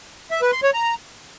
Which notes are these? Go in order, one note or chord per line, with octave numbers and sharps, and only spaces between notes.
E5
B4
C6
C#5
A#5